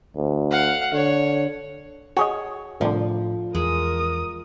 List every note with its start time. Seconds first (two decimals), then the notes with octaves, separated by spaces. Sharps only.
0.16 D2
0.51 F5 F#5
0.93 D3 C#5
2.17 F#4 G#4 C#5 D#5
2.81 C2 A2 D3 F3
3.55 E2 G#3 A#4 D#6